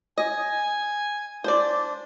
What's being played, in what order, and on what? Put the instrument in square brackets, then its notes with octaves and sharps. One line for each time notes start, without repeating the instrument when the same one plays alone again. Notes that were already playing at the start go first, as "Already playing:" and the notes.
[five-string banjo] D#5 [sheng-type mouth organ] G#5
[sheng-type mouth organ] D4 [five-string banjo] C5 D5